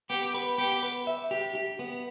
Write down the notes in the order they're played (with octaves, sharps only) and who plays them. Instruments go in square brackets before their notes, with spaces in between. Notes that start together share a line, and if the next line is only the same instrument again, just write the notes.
[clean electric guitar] B3 [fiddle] G4
[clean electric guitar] B4
[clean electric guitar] B3 [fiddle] G4
[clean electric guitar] B4
E5
G4
G4
B3